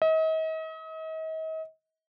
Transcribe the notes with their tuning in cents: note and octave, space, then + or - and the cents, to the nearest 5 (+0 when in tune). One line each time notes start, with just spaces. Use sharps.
D#5 +40